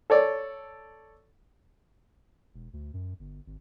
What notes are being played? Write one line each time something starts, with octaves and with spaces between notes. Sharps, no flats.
A4 C#5 D5
E1
D2
F#2
G1
G#1